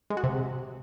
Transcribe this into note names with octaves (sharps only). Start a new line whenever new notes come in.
G#3
F#4
C3